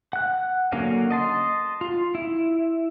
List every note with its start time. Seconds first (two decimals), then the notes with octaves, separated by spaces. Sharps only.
0.13 F#5 F#6
0.72 D3 F#3 A#3 C#4 F5
1.11 D#5 A5 C6
1.81 F4
2.15 E4